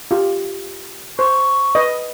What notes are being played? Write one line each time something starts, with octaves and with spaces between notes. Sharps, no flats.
F4 G4
C5 C#6
B4 D#5